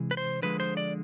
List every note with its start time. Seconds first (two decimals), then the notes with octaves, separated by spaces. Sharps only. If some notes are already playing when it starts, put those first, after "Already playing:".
Already playing: C3 E3 G#3
0.11 B4
0.17 C5
0.42 D3 F3 G#3 B4
0.60 C5
0.77 D5